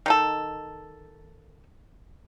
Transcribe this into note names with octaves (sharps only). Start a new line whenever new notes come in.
D#3 D#4 A4